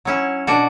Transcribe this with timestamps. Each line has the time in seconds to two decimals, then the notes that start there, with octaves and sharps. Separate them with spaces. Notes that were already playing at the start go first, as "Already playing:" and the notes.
0.05 F#3 C#4 E4
0.47 B2 D4 F#4